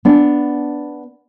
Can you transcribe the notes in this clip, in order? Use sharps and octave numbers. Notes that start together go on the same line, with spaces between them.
B3 D4